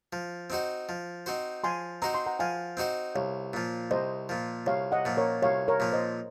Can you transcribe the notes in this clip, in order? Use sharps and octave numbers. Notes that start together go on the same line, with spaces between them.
F3
C4 D#4 F#4 C5
F3
C4 D#4 F#4 C5
F3 G#5 C6
C4 D#4 F#4 C5 A#5
C6
F#5 A#5
F3 F5 G#5
C4 D#4 F#4 C5
C2 C#5 F5
A#2 F3
C2 C5 D#5
A#2 F3
C2 C#5 F5
D#5 F#5
A#2 F3
A#4 C#5
C2 C#5 F5
A#4 C#5
A#2 F3
C5 D#5